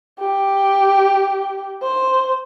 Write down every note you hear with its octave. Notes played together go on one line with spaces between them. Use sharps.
G4
C5